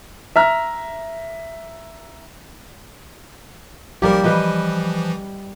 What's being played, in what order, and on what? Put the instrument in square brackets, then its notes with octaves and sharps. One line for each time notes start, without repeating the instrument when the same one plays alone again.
[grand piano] E5 A#5 F6
[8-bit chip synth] B1 F3 A#4 [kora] G3 A#3 G4
[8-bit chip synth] E3 F3 [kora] G3 B4 D#5